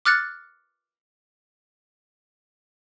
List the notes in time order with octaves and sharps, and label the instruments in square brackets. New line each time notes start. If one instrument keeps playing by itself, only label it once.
[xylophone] D6 F6 F#6 A6 C#7